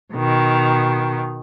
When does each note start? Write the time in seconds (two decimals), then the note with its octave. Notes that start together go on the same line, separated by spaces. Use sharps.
0.14 B2 D#3